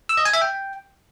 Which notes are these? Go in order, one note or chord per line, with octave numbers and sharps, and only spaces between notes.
E6
D#5
G#5
E5
G5